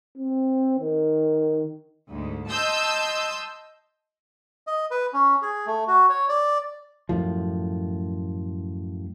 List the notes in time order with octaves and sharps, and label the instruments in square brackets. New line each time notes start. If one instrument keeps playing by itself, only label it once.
[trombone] C4
D#3
[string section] D2 G#2
D#5 A5 C6 E6 G6
[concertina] D#5
B4
C#4
G#4
A3
F#4
C#5
D5
[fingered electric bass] F#2 A2 F3